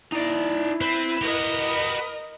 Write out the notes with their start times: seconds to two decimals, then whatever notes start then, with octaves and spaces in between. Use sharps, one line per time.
0.12 D#4 E4 D5
0.81 C4 B4
1.21 F#4 G4 A#4 D#5